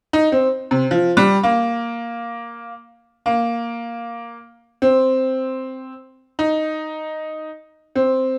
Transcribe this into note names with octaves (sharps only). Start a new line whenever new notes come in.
D#4
C4
C3
F3
G3
A#3
A#3
C4
D#4
C4